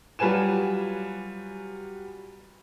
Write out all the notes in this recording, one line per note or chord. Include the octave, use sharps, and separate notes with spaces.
F#3 G3 F4 B4 G#5 E7